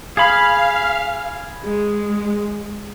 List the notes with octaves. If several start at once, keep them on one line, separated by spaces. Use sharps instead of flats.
G#4 F5 B5
G#3